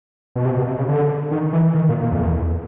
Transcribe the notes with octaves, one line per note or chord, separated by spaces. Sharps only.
B2
C3
B2
C3
C#3
D3
D#3
E3
D#3
A#2
A#2
F2
E2